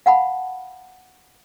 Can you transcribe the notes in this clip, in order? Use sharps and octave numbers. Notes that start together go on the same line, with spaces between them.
F5 F#5 A5 B5